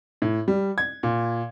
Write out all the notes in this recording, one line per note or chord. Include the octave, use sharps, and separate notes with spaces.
A2
G3
G#6
A#2